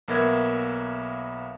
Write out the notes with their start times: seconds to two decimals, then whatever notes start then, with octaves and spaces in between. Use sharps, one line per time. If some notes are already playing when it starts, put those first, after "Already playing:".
0.08 B1 A#3 B3 A#4 E5 G#6